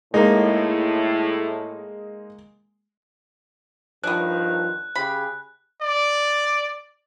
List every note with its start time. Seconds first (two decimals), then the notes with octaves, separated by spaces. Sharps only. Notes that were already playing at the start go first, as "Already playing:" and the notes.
0.14 A2 G#3 A#3 D#4
4.04 G2 D#3 F3 B3 D4 F#6
4.95 C#3 G4 G#4 B5
5.82 D5